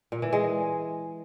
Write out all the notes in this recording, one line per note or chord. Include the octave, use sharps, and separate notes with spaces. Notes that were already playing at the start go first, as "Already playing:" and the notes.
A#2
E3
G#3